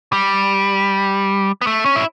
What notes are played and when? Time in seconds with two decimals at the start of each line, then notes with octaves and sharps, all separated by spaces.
0.13 G3
1.61 B3
1.67 A3
1.86 C#4
1.96 E4